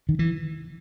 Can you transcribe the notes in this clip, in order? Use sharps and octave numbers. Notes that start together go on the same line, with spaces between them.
D#3
E3